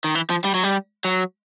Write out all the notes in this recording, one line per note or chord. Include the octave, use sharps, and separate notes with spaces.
D#3
E3
F3
G3
F#3
G3
F#3